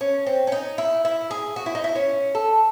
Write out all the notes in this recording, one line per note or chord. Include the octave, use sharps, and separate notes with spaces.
C#4
C4
C#4
D#4
E4
E4
G#4
F#4
E4
D#4
E4
C#4
A4